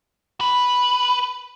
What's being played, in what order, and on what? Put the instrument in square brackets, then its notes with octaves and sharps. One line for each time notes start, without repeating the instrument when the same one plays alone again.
[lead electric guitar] B4